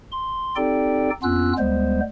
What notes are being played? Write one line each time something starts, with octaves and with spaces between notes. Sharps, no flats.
C6
C4 D#4 G4 A4 D5 G5
F2 B3 C#4 F4 E6 F#6
D2 G3 G#3 B3 C5